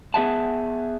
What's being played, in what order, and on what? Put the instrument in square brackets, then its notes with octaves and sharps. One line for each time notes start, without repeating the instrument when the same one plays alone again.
[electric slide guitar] B3 G#4 E5 F#5 A5